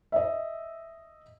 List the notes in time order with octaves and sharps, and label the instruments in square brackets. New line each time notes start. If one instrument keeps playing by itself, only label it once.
[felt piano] D#5 E5